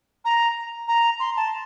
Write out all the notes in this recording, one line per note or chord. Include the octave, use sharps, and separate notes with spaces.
A#5
A#5
C6
A5